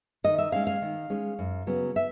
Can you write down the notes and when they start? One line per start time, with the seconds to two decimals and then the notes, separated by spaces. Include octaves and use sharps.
0.24 D#3 D#5
0.38 E5
0.52 G#3 C#4 F5
0.67 F5
0.82 D#3
1.10 G#3 C#4
1.39 F#2
1.67 C#3 F#3 B3
1.96 E5